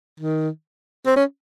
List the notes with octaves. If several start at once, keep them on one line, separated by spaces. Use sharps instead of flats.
D#3
C4
C#4